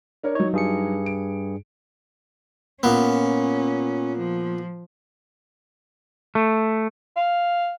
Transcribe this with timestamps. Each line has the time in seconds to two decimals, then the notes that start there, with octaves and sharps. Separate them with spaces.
0.23 D4 A#4 C#5
0.35 F#3 D#4 C#5
0.53 G2 G#4 C#7
1.06 D7
2.83 A#2 B3 C#4
4.18 F3
6.35 A3
7.17 F5